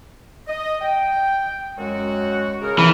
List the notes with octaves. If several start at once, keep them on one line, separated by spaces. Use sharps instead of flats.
D#5
G5
F#2 G#3 F#4
C#3 G#4 A#4
E3